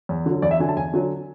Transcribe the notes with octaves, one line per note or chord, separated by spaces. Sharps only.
E2
D3 F#3
E2 D5
E5
D3 F#3 G#5
A5
E2 G#5
D3 F#3